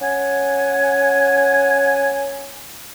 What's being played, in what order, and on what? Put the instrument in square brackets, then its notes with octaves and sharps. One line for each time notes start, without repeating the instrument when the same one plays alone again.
[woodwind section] C#4 F#5 G#5